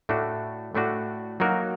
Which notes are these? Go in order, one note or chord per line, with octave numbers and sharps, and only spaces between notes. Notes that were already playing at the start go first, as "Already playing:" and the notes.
A2 A3 D4 F#4
A2 A3 D4 F#4
F#3 A#3 D#4 F#4 A#4